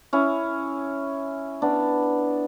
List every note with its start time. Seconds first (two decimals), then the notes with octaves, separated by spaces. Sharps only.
0.13 C#4 E4
1.62 B3 D4